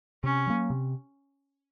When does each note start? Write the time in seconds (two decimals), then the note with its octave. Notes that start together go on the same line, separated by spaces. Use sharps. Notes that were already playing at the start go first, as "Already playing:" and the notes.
0.24 C3 C#4
0.47 F#3 A#3
0.70 C3